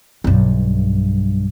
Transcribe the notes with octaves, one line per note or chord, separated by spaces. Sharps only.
B1 G2